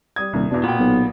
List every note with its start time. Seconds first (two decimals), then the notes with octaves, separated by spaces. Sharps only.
0.16 G3 D#6 G#6
0.33 D#1 C2
0.51 E2 B2 D4
0.64 A#2 B3 G5
0.79 B1